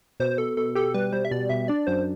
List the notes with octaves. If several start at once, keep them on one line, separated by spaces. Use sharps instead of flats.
B2 C5
B2 A4
B2 A4
G4 A4
G3 B4
G3 C5
E5
B2 D5
B2 E5
D4 D5
F#2 C5